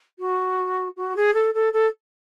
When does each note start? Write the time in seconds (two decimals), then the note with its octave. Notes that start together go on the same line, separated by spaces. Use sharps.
0.19 F#4
0.97 F#4
1.16 G#4
1.34 A4
1.54 A4
1.73 A4